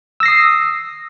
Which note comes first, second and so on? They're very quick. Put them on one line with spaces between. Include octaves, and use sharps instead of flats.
E6 A#6 C7 D#6